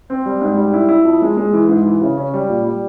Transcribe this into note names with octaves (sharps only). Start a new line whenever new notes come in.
C4
G3
G#2
G3
E4
E4
F2
G#3
G#3
E3
G#2
E3
C#3
C#4
G3
A#2
G3